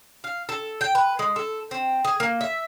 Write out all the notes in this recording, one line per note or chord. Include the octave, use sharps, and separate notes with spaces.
F5
A4
G5
B4
G#3
A4
C4
G#4
A#3
E5